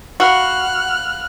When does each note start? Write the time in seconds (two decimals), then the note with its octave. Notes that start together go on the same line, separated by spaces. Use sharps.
0.20 F#4 F5 F#5 B5 F6 F#6